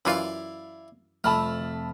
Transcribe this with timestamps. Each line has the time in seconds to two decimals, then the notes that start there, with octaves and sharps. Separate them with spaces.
0.05 F#2 E3 E4 F4 D5 F5
1.24 F2 C3 A3 A5 B5 E6 F6